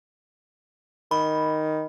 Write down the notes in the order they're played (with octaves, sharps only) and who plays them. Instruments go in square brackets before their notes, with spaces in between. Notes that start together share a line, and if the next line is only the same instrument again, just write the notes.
[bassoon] D#3 [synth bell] B5